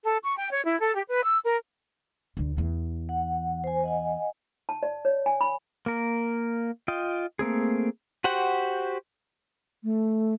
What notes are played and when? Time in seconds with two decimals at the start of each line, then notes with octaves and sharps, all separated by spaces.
0.04 A4
0.23 C#6
0.37 G5
0.51 C#5
0.65 E4
0.81 A4
0.95 G4
1.07 B4
1.23 E6
1.44 A#4
2.37 D2 D3
2.57 E2 E3
3.09 F#5
3.64 C5 G#5
3.84 D#5 F#5 G#5
4.69 A5
4.83 D5
5.05 C#5
5.26 G#5
5.41 B5
5.86 A#3 A#4
6.88 F4 D#5 G5
7.39 A3 A#3 C4 G#4
8.24 F#4 G4 C5 F#5
9.84 A3